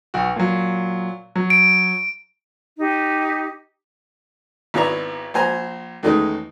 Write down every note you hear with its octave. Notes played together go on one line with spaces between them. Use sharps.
B1 F#4
A#2 F#3
F#3
D7
D#4 G4
G#1 B3 E4 C#5 D5 A#5
A#1 C5 G#5 A#5
E2 D#3 G#3 A3 C#4 D#4